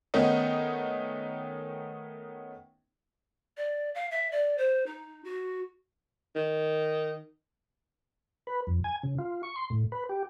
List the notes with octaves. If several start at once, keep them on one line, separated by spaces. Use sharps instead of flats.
D#3 A3 B3 C#4 D#4
D5
F5
E5
D5
C5
D#4
F#4
D#3
B4
F2
G#5
C#3
F4
C#6
C6
A2
B4
G4